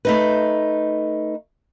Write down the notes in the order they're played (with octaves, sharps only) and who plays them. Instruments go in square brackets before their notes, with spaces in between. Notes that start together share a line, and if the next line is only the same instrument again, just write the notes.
[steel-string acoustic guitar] A3 D#4 B4